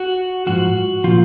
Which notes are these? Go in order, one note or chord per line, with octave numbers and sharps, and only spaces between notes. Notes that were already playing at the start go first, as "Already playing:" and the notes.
Already playing: F#4
G#2 F3 F#4
A#2 F3 F4